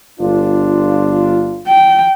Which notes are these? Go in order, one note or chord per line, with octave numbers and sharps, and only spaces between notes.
G1 D4 F4
G5